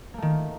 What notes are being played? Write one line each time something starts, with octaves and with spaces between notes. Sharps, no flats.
D#3 A3 A#3